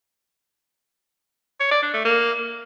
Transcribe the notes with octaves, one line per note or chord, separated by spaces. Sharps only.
C#5
D5
D4
A3
A#3